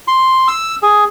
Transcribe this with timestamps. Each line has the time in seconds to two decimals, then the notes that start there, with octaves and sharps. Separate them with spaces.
0.08 C6
0.48 E6
0.83 G#4